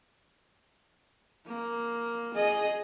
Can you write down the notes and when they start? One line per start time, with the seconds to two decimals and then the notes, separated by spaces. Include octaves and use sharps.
1.46 A#3
2.34 G#4 D#5